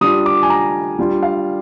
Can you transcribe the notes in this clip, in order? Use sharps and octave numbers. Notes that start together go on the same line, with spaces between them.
G3 D4 F4 D#6
D6
G#5
A#5
G3 D4 F4
F5